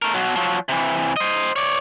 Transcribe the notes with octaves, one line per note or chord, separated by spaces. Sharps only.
A3 A#4
B2 F#3
F3 F#3
C3 E3
C5 D#5
C#5 D5